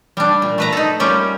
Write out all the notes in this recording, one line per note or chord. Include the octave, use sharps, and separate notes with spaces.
G3 D4
A#2
A3 B4 A#5
D#4 A4
G3 A#3 C#4 F4 G4